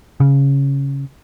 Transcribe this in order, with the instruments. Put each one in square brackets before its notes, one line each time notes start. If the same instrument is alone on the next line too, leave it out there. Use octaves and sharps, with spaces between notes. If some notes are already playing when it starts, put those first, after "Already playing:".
[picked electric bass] C#3